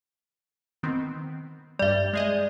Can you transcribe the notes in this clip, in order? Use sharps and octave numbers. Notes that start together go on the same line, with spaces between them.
D#3 B3 C4
G2 G3 D5 E5
G#3 G#4 D#5